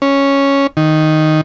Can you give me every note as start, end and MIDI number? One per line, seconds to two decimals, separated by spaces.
0.02 0.67 61
0.77 1.41 51